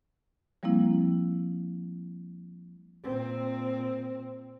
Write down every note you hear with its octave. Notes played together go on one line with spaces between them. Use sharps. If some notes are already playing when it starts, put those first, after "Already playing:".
F3 G3 A#3 C4 E4
A#2 C4